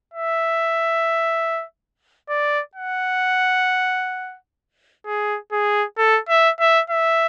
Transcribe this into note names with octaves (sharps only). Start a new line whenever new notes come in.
E5
D5
F#5
G#4
G#4
A4
E5
E5
E5